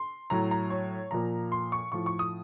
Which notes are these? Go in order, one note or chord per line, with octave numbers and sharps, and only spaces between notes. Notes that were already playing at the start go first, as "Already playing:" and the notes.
Already playing: C6
A2 F#3 A#5
A#5
C#5
A#2 F3 A#5
C6
C#6
A2 F3 C#6
C#6
D#6